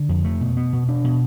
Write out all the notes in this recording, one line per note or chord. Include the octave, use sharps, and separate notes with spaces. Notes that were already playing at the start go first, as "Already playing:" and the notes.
Already playing: D3
F2
A3
B2
B3
B2
D4
B2